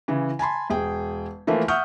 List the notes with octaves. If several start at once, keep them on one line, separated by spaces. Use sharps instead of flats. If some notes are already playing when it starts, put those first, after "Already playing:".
C#3 E3
G#5 A5 B5 C6
E1 G#4 G5
E3 F3 A3 A#3
E5 F#5 C#6 D#6 F6 G6